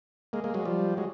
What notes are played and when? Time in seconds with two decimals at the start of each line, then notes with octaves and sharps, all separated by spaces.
0.33 G#3 A#3
0.44 G#3 A#3
0.54 F#3 G#3
0.65 F3 G3
0.97 F#3 G#3